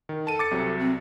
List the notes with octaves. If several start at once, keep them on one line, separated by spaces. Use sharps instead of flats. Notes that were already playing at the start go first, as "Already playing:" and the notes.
D#3
A4 A5 D#7
D6 A6 C#7
C2 C3 F#3
C4